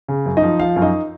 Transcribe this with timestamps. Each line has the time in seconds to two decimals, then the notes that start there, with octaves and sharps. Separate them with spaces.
0.08 C#3
0.26 F#2
0.37 D#4 D#5
0.43 F3
0.59 F3 F4 F5
0.76 F#2
0.82 D#4 D#5